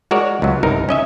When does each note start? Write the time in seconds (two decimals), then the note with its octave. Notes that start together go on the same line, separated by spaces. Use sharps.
0.11 G#3 F#4 A#4 C#5 D5
0.42 C#2 F#3
0.63 G1 C2 D#4 A#4
0.89 C#4 D#5 E5